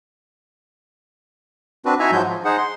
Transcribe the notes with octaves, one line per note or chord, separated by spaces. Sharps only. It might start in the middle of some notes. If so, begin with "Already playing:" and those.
C4 D4 F#4 B4
D#4 E4 F#4 E5 G#5 A#5
G#2 F3 F#3 G#3 F#4 G6
F3
D#4 G#4 C5 F#5
C6